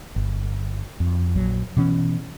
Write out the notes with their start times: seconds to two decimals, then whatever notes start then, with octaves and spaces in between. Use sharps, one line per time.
0.16 G1
1.00 F2
1.35 A#1 F#3
1.77 B2 E3 C#4